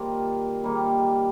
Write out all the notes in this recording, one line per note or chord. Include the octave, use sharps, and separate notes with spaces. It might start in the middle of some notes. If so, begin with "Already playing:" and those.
Already playing: D#3 G3 A#3 F4
D#3 G3 A#3